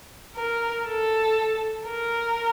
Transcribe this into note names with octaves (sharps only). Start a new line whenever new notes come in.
A#4
A4
A#4